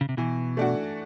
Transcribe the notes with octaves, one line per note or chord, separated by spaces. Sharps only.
C#3
C3
B2 E3
A3 D4 F#4